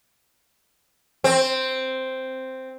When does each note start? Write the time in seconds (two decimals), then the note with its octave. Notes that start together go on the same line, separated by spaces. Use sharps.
1.24 C4